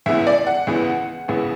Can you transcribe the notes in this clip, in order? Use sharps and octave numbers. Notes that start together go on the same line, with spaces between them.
C#2 C#3 E3 B3 E5
D5
F#5
C#2 C#3 E3 B3
C#2 C#3 E3 B3